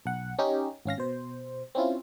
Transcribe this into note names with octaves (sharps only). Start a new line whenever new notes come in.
B1 F#5
C#4 D#4 G4
G#1 C#4 F5 A#6
B2 C5
C4 C#4 E4 F4